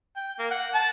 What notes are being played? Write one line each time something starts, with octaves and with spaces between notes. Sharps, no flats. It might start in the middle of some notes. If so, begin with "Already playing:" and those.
G5
A#3
F#5
A5